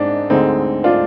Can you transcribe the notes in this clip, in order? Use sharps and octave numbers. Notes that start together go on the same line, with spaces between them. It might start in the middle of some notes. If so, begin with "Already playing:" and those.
Already playing: G#2 C4 D4 D#4
D2 D3 G#3 C4 D#4
D4 F4